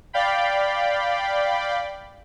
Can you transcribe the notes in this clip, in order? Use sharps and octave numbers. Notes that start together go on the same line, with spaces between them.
D5 F5 G5 B5